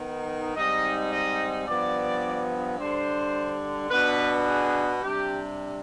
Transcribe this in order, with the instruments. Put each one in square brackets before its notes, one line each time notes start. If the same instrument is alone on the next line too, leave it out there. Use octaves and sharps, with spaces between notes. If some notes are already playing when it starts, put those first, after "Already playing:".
Already playing: [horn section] D#3 B3 D#4
G#2 G3 C4 D#4 D#5
D#5
G2 F3 B3 D5
D3 G3 D4 C5
B2 B3 D4 B4
G#4
C3 G3 D4 G4